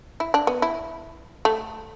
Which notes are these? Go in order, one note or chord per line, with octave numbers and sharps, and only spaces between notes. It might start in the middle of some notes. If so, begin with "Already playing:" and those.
E4
D4
B3
E4
A3